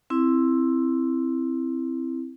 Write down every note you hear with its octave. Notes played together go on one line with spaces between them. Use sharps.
C4 E4